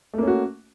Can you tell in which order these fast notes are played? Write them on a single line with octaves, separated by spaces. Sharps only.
A3 A#3 C#4 F#4